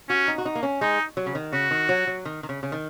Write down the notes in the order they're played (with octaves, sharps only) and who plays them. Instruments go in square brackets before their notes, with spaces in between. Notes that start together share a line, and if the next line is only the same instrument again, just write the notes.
[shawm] C#4 [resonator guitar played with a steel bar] F#4
[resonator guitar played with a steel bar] D#4
F#4
D#4
A#3
C#4
[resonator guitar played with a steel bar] G#3 [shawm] D#4
[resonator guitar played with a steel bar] F#3
C#3
D#3
[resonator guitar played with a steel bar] C#3 [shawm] F#4
[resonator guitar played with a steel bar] D#3
F#3
F#3
D#3
D#3
C#3
C#3
D#3